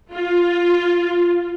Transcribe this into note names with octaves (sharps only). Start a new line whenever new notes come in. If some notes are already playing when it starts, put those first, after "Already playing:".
F4